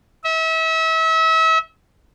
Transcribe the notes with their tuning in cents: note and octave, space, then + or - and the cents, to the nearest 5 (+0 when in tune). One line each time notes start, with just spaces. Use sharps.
E5 -35